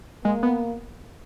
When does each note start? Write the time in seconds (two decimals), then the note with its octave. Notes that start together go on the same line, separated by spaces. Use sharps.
0.24 G#3 A#3
0.43 B3